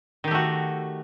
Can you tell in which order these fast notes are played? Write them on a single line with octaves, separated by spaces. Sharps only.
D#3 G4 A3 F#4